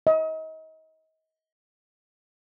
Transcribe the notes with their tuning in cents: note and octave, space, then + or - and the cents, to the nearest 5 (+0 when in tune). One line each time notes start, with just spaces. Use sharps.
D#5 +30